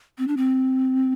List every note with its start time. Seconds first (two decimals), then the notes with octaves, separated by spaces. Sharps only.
0.18 C4
0.28 D4
0.37 C4